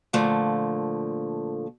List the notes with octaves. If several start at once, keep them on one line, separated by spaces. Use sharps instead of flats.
A#2 D3 F3 A3 A#3